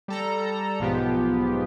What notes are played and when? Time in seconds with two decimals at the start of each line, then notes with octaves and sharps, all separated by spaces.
0.08 G3 A4 A#5
0.80 B1 G#2 F3 B3 G4